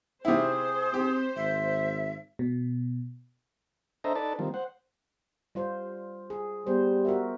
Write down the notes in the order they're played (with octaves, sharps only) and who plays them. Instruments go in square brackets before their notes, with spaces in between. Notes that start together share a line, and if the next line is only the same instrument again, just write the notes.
[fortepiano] C3 E4 [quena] G#4 [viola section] C5
[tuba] C4 [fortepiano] G4
[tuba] G#1 [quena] E5
[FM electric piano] B2
[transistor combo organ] D4 A4 C5 D#5 E5 A#5
D#4 A4 B4 D5 A5
D#3 F3 G3 A#3 C4
C5 F#5
[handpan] G3 F4 C5
G#4
[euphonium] G3 [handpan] B3 C5
[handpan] F#4 A#4 E5